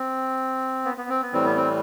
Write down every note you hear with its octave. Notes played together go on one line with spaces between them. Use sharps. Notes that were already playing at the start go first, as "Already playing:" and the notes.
Already playing: C4
B3
B3
C4
B3
A2 E3 G3 C4
B3
C4